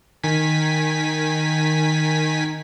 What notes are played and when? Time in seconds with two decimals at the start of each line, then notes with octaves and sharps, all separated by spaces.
0.23 D#3 G#5 B6